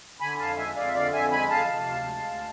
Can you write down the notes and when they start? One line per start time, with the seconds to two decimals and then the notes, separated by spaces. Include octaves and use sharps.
0.20 D3 G#5 B5
0.39 F2 F5 A5
0.57 G#3 E5 G#5
0.76 F2 D5 F5
0.87 E5
0.94 D3 D5 F5
1.13 F2 E5 G#5
1.31 G#3 G#5 B5
1.50 F2 F5 A5
1.68 C3
1.86 D2
2.05 G#3
2.24 D2